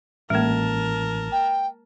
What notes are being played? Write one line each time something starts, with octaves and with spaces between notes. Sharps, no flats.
A1 G#3 A#3 A#4 A5
G5